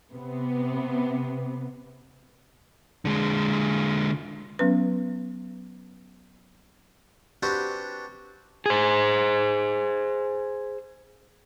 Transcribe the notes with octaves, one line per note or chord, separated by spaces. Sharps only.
C3 B3
D3 G#3
F#3 B3 C#4 B4
C4 D4 F#4 G4 B4
G#4 C5